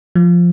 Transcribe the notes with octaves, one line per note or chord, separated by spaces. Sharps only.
F3